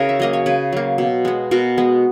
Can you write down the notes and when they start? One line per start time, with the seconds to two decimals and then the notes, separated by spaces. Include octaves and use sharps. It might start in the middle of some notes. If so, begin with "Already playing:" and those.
Already playing: C#3 E4 F#4 G#4 A#4
0.09 E5
0.20 F#3 A#3 D#5
0.33 C#5
0.46 C#3 G#4 B4
0.72 F#3 A#3
0.98 B2
1.25 G#3 B3
1.51 B2 F#4 A#4
1.78 G#3 B3